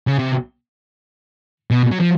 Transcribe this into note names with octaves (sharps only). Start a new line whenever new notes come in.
C#3
C3
B2
F#3
F3